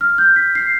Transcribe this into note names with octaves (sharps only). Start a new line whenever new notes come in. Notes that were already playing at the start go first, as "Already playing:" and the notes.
F6
G6
B6
C7